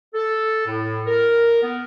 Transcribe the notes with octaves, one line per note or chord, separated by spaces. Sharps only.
A4
A2
A#4
B3